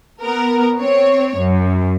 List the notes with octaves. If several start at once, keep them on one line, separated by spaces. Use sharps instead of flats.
B3 A#4
C4 C#5
F#2